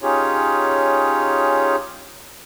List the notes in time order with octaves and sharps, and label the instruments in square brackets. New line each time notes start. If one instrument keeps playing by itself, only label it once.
[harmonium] C#4 D#4 F4 G4 G#4 C#5